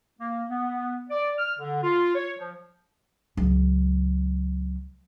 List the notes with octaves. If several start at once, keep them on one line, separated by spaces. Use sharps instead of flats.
A#3
B3
D5
F6
D3
F4
C#5
F3
C#2 F#3